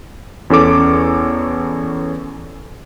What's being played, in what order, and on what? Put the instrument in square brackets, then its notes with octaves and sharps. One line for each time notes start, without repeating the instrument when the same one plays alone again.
[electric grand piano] E2 C#4 A4 D6